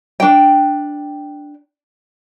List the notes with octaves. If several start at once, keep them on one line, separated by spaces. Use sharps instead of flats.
D4 G5